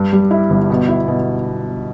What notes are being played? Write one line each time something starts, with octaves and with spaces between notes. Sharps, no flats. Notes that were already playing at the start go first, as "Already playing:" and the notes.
Already playing: G2
G3
E4
G1
B2
E4
B2